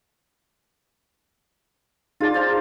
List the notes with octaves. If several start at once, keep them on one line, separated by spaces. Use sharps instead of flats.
D4 D#4 F4 G#4 A6
C5 F5 A#5